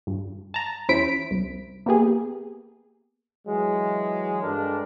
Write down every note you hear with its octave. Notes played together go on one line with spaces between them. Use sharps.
G2
A5 A#5
E2 C#4 E4 C5 B6 D7
C2
A#3 B3 G4 G#4
E3 F#3 G#3
G2 G#3 D4 A4 A#4